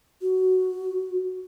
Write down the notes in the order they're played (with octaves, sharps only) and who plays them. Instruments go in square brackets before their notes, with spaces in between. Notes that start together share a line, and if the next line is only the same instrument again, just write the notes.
[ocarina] F#4